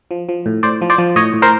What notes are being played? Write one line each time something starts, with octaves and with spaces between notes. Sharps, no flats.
F3
F3
A2
A2 C5 D5
F3
C5 D5
F3
A2 C#5 D#5
A2
A#4 C5